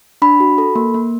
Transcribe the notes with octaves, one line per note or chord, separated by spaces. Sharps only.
D4 B5
F#4
A4
A#3
A#3